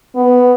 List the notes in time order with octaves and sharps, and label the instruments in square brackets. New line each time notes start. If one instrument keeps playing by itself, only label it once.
[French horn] B3